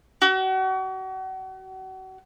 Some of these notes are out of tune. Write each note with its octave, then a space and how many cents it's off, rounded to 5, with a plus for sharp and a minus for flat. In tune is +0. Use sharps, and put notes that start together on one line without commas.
F#4 +35